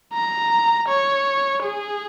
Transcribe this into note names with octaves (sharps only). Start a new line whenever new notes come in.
A#5
C#5
G#4